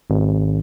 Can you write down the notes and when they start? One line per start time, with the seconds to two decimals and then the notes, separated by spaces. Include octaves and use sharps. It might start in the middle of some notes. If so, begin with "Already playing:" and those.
0.10 G#1